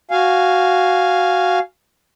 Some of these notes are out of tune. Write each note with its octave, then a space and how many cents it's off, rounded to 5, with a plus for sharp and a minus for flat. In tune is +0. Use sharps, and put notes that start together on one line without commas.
F#4 +0 F5 +0 G#5 +0